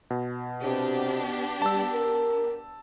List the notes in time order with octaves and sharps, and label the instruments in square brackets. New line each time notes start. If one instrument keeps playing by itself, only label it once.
[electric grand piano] B2
[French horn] C3 [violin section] B3 D4 G4
[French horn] G3 [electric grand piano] A5 E6
[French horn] A#4